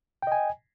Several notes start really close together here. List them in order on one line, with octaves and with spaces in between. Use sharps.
G5 D#5 G#5